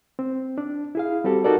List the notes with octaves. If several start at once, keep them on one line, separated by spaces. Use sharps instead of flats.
C4
D4
E4 G#4 F5
G3 C4 F#4 G4 A4
D#4 F#4 A4 A#4 D5